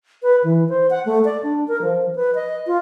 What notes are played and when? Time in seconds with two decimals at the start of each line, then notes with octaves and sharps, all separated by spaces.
0.23 B4
0.44 E3
0.69 C5
0.90 F#5
1.06 A3
1.25 D5
1.43 D4
1.68 A#4
1.82 F3
2.15 B4
2.35 D#5
2.67 F4